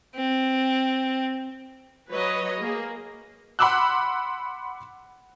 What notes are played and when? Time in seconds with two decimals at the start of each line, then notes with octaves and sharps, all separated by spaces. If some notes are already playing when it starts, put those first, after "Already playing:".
0.16 C4
2.11 F#3 B4 C#5 D#5
2.60 A#3 G#4
3.59 F#5 B5 C6 D6 E6 F#6